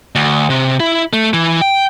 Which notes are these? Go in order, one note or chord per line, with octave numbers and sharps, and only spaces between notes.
D2
C3
E4
A3
E3
G5